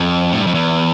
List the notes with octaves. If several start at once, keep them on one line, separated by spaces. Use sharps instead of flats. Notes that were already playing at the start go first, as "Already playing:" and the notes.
Already playing: F2
A2
G2
F2
E2